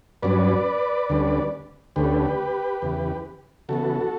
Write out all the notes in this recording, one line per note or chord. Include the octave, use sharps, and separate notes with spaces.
G2 F#3 C#4 B4 D5
D2 D3 G3 C#4
D2 D3 A3 C#4 G4 B4
E2 C#3 E3
C#3 E3 B3 F#4 A4